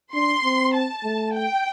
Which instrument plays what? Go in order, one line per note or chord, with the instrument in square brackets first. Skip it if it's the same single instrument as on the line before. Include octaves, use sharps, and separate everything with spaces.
[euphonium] D4 [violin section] C6
[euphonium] C4
[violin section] A5
[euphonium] A3
[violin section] G5